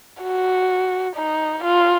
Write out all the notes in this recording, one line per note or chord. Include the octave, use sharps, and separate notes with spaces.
F#4
D#4
F4